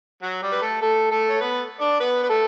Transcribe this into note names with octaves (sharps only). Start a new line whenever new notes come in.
F#3 F#4
G3 G4
B4
A3 A4
A3 A4
A3 A4
C#5
B3 B4
D4 D5
B3 B4
B4
A3 A4